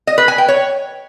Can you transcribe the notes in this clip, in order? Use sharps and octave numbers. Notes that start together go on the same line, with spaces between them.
D#5
B4
G#5
G5
C#5